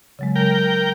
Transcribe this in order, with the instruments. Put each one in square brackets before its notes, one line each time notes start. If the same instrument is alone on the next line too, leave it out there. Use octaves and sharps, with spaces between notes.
[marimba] C#3 F#3 G#3
[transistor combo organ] A#4 G5